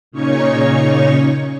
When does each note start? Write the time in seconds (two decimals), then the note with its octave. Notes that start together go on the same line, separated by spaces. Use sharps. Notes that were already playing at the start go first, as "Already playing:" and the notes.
0.12 A#2 C#3 C#4 D#4 C#5 C#6